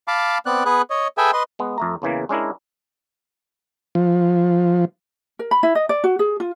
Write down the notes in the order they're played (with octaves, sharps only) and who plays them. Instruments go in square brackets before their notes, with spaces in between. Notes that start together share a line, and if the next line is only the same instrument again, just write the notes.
[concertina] F5 A5 B5 D6
B3 C4 D5 F#6
B3 G#4 B4 F#6
C#5 D#5
G#4 A4 B4 E5 G5 G#5
B4 D#5 C6
[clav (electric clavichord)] G#3 B3
F2 A3 A#5
E2 C#3 E3 A#3
G#3 C#4 D4 E4 A#4
[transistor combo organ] F3
[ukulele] A#4
B5
E4
D#5
D5
F#4
G#4
F4